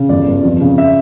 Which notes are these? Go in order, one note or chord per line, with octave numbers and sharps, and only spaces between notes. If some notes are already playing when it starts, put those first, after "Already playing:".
Already playing: C#3
G1 D5
G2
F2
C#3
E5